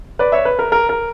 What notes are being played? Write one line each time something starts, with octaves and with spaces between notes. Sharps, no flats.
B4 D5
C#5 E5
B4
A#4
A#4
A#4